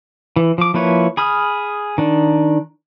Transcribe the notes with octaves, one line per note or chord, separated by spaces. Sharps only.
E3
F3 D6
F3 A#3 E4 B4 C#5
G#4 B5 D#6 F6
D#3 D4